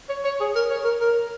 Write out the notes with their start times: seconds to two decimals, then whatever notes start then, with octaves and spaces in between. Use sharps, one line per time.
0.09 C#5
0.24 C#5
0.40 G#4
0.55 A#4
0.70 C#5
0.84 A#4
1.01 A#4